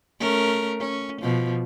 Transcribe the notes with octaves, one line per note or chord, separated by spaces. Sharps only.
A3 C#4 A#4
C#4
B2 F3